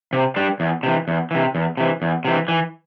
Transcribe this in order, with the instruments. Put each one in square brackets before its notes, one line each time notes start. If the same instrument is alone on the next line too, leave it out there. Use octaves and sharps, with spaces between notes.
[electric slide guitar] C3
G3 D4
E2
C3 E3
E2
C3 E3
E2
C3 E3
E2
C3 E3
E3